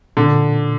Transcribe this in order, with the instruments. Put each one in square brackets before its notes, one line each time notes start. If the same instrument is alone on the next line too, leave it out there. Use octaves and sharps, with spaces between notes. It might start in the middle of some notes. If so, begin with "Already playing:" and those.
[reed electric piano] A#2 [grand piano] D3